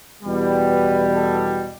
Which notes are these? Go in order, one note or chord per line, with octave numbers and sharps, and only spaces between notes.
E2 B2 G3
B4
A4